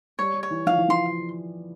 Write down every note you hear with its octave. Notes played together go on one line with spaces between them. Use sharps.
G3 C#5
G3
C#5
E3
F3 F5
E3
F3 C6